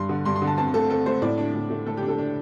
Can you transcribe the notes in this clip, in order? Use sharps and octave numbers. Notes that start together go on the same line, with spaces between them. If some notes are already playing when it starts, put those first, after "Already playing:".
Already playing: G2 C6
D3
G2 C6
C6
D3
A5
C4 A5
A3 A4
C4 A4
A3 C5
A2 D5
D4
A2
A3
A3 A4
G4
D4
A4
D4